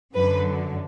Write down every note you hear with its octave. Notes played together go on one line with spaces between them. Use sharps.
F#2 D3 F#3 B4